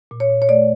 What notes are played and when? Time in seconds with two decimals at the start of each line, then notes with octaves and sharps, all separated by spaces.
0.11 A#2
0.20 C#5
0.30 A#2
0.42 C#5
0.49 A3 D5